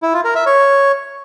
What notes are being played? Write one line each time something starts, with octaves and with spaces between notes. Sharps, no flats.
E4
F4
A#4
E5
C#5